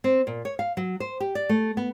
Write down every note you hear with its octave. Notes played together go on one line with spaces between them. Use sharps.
C4
A#2
C#5
F5
F#3
C5
G4
D5
A3
B3